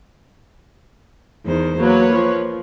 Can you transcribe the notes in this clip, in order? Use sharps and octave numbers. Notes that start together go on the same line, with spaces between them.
E2 D#3 C5
F#3 A#3 B4 C#5
F3